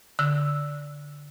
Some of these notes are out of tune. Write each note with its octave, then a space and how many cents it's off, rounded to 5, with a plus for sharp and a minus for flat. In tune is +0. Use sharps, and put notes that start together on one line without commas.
D3 -10 E6 +0